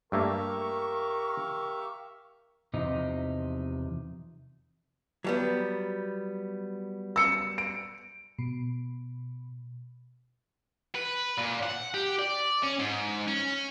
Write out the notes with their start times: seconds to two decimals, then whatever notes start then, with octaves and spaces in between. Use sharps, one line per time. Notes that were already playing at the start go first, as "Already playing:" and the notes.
0.12 G2 A3 A#3 G4 A#4 E5 F5 C#6
2.73 E2 C3 F3 D#4
5.24 F#3 G3 B3
7.16 E6 C#7
7.58 D7
8.39 B2
10.95 B4
11.38 A#2
11.63 F#5
11.94 G4
12.19 D5
12.64 C#4
12.80 G#2
13.27 C#4